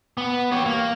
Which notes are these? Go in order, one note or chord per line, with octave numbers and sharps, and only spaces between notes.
B3
G4 C#5
A#3